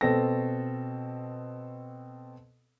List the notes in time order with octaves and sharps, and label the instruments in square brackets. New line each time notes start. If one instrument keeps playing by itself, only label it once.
[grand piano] B2 C4 A4 A#6